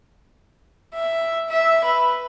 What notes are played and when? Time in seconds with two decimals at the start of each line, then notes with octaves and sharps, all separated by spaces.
0.95 E5
1.50 E5
1.84 B4